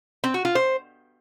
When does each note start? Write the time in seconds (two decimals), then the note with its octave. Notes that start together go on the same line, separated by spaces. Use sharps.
0.24 C4
0.34 F#4
0.45 F4
0.55 C5